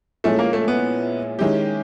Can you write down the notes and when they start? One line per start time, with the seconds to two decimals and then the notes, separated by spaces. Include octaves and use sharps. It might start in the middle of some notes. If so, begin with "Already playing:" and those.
0.24 A#2 F3 G#3 A3 C#4 E4
0.39 A#3
0.53 A3
0.68 B3
1.39 D#3 G#3 C#4 E4 G4